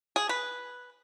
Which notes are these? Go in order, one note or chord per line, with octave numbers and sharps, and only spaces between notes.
G#4
B4